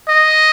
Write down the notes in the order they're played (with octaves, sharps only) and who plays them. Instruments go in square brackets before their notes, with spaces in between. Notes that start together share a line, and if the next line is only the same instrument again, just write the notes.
[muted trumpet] D#5